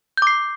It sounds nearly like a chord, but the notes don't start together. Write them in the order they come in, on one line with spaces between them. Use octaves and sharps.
G6 D6 C7